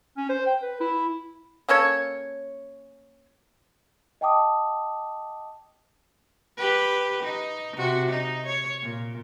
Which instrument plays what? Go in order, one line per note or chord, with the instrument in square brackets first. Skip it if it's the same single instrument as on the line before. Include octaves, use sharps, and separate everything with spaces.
[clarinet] C#4
C5
G5
B4
E4
[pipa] A#3 C#4 A4 C#5
[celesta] D#5 F#5 G5 A5 D6 D#6
[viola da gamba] G4 B4
D#4
C3 F#4
D#4
C#5
A#2